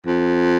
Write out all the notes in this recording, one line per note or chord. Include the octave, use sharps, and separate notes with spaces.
F2